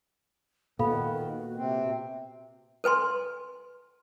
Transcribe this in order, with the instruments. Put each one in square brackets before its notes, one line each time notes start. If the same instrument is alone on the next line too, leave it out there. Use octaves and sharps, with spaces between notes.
[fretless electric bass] A#2 B3 [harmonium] D#3 [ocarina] F#4 [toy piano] A4 F5 B5
[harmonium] C3 C4
[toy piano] A4 B4 G#5 C6